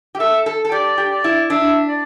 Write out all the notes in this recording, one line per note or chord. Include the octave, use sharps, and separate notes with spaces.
G4
A4 E5
A4
A4
G4 D5
G4
D5
E4
D4 E5
D5